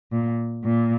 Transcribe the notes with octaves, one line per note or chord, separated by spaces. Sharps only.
A#2
A#2